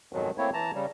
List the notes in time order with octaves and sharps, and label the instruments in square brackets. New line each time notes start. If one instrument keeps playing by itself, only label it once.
[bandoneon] F2 G#2 B2 D#3 F#3
A3 A#3 C4 E4 C#5
E3 A5 A#5
C#3 G3